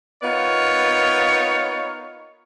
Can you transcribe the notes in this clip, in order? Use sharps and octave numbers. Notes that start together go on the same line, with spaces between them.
B3 D#4 F4 A#4 C#5